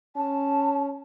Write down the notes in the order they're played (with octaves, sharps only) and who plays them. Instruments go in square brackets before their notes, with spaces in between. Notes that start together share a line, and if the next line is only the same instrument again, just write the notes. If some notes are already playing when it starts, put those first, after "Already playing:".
[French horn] C#4 [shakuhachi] A5